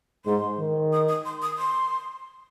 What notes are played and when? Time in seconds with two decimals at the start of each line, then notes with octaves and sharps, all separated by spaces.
0.25 G#2 C6
0.58 D#3
0.92 D#6
1.08 D#6
1.25 C6
1.42 D#6
1.58 C6